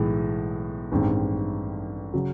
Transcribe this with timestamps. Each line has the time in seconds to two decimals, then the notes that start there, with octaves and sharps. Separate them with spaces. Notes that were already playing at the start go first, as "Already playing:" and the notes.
Already playing: B1 A2 E3 G#3
0.92 A1 G2 D#3 G#3 C4
2.14 C#3 F#3